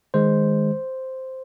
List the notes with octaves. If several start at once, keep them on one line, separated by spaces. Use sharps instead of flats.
D#3 G#3 C5